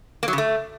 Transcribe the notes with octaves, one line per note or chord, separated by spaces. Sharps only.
A#3
F#3
C#3
A3